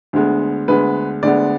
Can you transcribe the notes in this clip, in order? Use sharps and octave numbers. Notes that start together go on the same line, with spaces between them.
D2 D3 G#3 B3
D2 D3 G#3 B3 B4
D2 D3 G#3 B3 D5